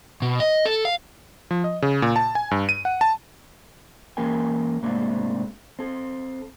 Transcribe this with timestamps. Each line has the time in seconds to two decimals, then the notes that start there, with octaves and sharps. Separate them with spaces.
0.22 B2
0.40 D#5
0.65 A4
0.85 F5
1.51 F3
1.64 D#5
1.82 C#3
2.02 A#2
2.16 A5
2.35 G#5
2.51 G2
2.69 D#7
2.85 F#5
3.01 A5
4.17 E3 A#3 C#4 A#4 G5 G#5
4.83 G#2 C3 A3 A#3 C4 D4
5.79 C4 A4